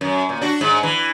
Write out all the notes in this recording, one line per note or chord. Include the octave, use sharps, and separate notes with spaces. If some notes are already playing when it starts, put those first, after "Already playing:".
F#2
A#2
D4 F#4
G#2
E3